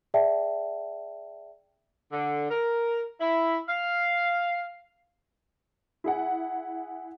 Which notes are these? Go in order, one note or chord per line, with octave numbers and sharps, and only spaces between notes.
G#4 D5 E5 G5 A5
D3
A#4
E4
F5
E4 G#4 F#5